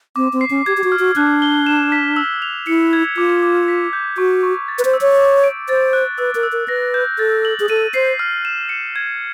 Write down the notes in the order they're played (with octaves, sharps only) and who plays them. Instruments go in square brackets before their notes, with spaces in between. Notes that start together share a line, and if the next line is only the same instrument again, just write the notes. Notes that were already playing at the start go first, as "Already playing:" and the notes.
[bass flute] C4 [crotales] D6
[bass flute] C4
[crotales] C7
[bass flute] C#4
[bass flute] G4 [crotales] G#6
[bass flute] G4
F#4
[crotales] F6
[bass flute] F#4
[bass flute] D4 [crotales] F#6
[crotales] G7
E7
B6
E6
F7
[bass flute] E4 [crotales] C#7
[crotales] G#6
[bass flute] F4 [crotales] D6
[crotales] D6
B6
G6
[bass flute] F#4 [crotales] C#6
[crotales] C#6
A6
[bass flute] B4
C5
[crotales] E6
[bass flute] C#5
[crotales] D6
D7
[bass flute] C5 [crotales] A6
[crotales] F#6
[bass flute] B4 [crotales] E6
[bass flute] A#4
[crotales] E6
[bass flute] A#4
[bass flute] B4 [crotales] A#6
[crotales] G6
[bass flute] A4 [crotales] A6
[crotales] F#7
[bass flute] G#4
[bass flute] A4 [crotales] D#7
[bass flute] C5 [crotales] C7
[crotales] F6
E7
C#7
G#6